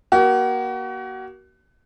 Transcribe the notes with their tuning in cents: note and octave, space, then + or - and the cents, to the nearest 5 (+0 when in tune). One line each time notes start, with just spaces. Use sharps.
A#3 +30 F#4 +35